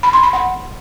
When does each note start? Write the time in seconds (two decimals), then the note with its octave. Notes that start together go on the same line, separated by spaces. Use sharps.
0.03 B5
0.13 C6
0.23 B5
0.33 F#5